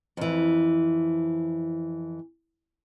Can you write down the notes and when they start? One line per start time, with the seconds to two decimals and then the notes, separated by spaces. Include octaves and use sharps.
0.17 F2 E3